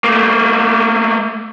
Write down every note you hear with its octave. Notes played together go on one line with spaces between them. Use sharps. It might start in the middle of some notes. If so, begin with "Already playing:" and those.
A3 A#3